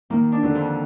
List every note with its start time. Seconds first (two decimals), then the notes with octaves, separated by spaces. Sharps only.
0.10 D#3 A#3
0.32 D4
0.43 D3
0.55 F2